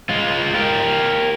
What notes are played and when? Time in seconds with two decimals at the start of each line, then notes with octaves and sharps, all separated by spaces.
0.09 G#3 F4
0.55 G4 A#4